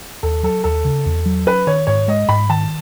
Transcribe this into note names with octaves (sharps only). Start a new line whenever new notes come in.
D#2 A4
F#3 A4
D#2 A4
C#3
E2
F#3
C#4 B4
D#3 C#5
G#2 C#5
G#3 D#5
G#2 B5
D#3 A5